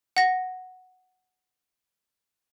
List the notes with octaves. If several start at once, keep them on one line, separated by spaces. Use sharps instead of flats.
F#5 A#6